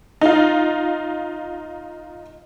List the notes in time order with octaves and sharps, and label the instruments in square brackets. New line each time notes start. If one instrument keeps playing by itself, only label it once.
[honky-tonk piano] D#4 F4